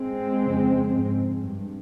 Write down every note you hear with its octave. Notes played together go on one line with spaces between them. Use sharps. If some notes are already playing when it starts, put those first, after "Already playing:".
Already playing: G#3 C4
F2 C#3
G#2
G2